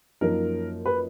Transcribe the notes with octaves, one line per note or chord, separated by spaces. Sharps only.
F#2 F3 A#3 D#4 A#4
B4